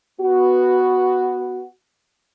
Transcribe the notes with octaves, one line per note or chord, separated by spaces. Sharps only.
B3 F#4